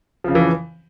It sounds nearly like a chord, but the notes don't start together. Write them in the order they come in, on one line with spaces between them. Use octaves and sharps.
F3 C#3 F2 E3